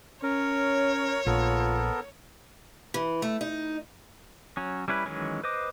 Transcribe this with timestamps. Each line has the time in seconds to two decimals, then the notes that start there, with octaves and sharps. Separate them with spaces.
0.23 C#4 A#4 C#5
1.26 A#1 B3 F4 A4 A#4
2.94 E3
3.22 A3
3.41 D#4
4.57 F#3 C#4
4.88 G3 C#4 E4 B4
5.06 D#3 E3 F#3 G#3 C#4
5.44 B4 C5 D#5 D6